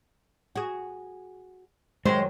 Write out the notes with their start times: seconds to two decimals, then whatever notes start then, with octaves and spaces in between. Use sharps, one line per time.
0.56 F#4 G#4
2.05 F#2 D#3 F#3 G#3 C5